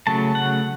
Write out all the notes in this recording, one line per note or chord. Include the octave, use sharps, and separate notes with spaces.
C#3 F#3 A3 A5
F#5